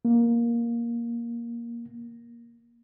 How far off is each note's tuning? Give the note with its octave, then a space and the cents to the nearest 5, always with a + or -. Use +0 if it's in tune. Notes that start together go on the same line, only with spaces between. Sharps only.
A#3 +10